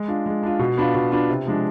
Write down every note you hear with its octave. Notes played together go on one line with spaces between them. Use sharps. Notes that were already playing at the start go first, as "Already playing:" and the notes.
Already playing: G#3
D4 F4
G#3
D4 F4
B2
B3 D4 F4
B2
B3 D4 F4
C3
F3 G#3 D4